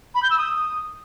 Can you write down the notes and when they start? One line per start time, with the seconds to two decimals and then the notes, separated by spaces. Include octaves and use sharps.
0.15 B5
0.23 G6
0.30 E6
0.38 D#6